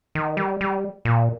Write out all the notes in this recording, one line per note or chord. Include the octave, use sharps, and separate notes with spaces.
D#3
G3
G3
A#2